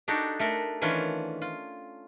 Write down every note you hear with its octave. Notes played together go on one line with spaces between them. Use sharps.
D4 D#4 F#4 G4 A4 D5
A3 A4 A#4
D#3 E3 C#4 D4 F4 C#5
F4